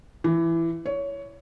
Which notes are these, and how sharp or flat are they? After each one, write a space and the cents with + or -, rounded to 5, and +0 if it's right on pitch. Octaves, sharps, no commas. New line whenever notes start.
E3 +15
C#5 +15